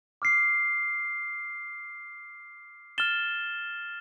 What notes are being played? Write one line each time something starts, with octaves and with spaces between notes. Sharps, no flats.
D6 F6 C7
F6 A6 E7 G7